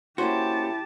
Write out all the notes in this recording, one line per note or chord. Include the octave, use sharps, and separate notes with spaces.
A#3 C#4 E4 F#4 G4 C5 A5